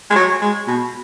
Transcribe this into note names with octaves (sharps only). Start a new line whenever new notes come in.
G#3
F#3
G#3
B2